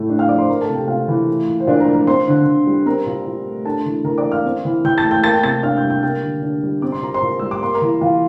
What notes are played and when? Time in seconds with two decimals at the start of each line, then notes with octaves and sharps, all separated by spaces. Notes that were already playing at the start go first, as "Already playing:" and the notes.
Already playing: A2 A3
0.10 D4
0.19 F5 F6
0.28 F3 D5 D6
0.38 C5 C6
0.49 A3 A#4 A#5
0.62 A4 A5
0.68 C3
0.75 G4 G5
0.88 C3 F4 F5
1.08 E3
1.27 A3
1.48 A#2
1.60 C5
1.67 A#2 D4 D5
1.80 A#4 A#5
1.88 F3
1.94 A#4 A#5
2.07 C4 C5 C6
2.27 D3
2.46 D3
2.67 G3
2.86 C4 A#4 A#5
3.06 A#2
3.26 A#2
3.46 A3
3.65 D4 A4 A5
3.86 E3
4.04 E3 A#4 A#5
4.18 D5 D6
4.25 A#3
4.31 F5 F6
4.45 C4
4.65 E3
4.85 E3 G5 G6
4.98 A5 A6
5.04 A3
5.11 G5 G6
5.23 A#3 A5 A6
5.34 G5 G6
5.43 C3 A5 A6
5.63 D4 F5 F6
5.77 G5 G6
5.83 G3
5.90 G5 G6
6.03 A#3 G5 G6
6.23 D3
6.43 D4
6.63 G3
6.82 C4 D6
6.92 C6
7.02 A#2 A#5
7.14 C5 C6
7.22 A#2
7.39 G3 E6
7.51 D6
7.62 A#3 C6
7.74 A#4 A#5
7.81 E3
8.01 E3 F4 F5